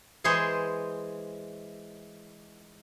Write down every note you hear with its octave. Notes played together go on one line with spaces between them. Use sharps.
E3 G#3 G#4 C5 C#5